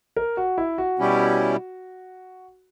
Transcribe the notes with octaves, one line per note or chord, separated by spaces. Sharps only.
A#4
F#4
E4
F#4
B2 G3 C#4 E4 G4